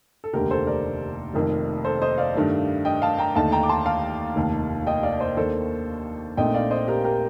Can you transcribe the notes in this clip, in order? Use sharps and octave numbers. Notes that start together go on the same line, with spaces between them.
A4
F1 D#2 D3 G4 A#4
A4 C5
A#4 D5
F1 F2 D#3 A#3
A4 C5
C5 D#5
D5 F5
G2 D#3 A3 D4
D#5 G5
F5 A5
G5 A#5
D#2 D3 A3 D#4 F5 A5
G5 A#5
D6
A5 C6
F5 A5
F1 D#2 D#3
D#5 G5
D5 F5
C5 D#5
D#2 D#3 A#3 D4 A4 C5
A#1 A#2 A3 C4 D#4 D#5 G5
D5 F5
C5 D#5
G4 A#4
G4 A#4